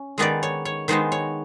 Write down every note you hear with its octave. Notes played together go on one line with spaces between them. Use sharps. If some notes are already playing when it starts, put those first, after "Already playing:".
Already playing: C#4
D#3 G#3 B3 D#4 D5
C#5
C#5
D#3 G#3 B3 D#4 C5
C#5